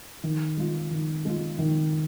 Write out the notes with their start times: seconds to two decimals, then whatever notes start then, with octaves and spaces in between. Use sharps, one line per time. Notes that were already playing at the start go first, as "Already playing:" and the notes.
0.23 D#3
0.57 G#3 F4
0.91 D#3
1.25 G#3 F4
1.59 D#3